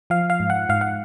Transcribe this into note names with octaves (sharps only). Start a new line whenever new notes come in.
F3 F5
F5
G#2
F#5
G#2 F5
F#5